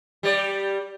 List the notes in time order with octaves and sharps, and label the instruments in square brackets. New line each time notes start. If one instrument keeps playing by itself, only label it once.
[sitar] G3 D5